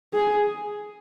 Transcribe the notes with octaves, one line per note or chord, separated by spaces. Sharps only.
G#4